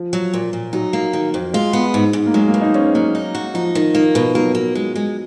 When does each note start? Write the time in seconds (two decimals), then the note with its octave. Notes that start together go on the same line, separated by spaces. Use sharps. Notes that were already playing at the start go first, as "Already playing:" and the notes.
Already playing: F3
0.13 F#3
0.34 A#2
0.53 A#2
0.73 F#3 D#4
0.93 A#3
1.13 D#3
1.34 F2
1.54 G#3 F4
1.73 B3
1.94 G#2
2.13 G#2
2.26 A#3
2.34 F#3 G#3
2.47 A#3
2.54 B2
2.61 D#4
2.74 G#2 C#4
2.94 F#3 A#3
3.15 D#4
3.35 F#4
3.54 F3 D#4
3.75 D#3
3.95 A#3
4.15 B2
4.35 F#3 A#3
4.55 A#3
4.75 G#3
4.95 G#3